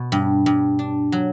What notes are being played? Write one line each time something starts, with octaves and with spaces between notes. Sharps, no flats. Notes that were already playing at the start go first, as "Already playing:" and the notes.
Already playing: B2
G2
G2
D4
F#3